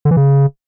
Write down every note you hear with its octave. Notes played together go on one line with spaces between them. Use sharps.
D3
E3
C#3